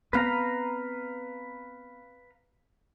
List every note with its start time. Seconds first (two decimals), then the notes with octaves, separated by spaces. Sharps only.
0.13 B3 C4 B4 F5 A#5